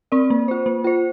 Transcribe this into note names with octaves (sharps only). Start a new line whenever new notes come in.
C4 A#4 D5
A#3
F4 C5
A#3
F4 C5